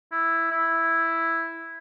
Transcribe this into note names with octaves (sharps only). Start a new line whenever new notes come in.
E4
E4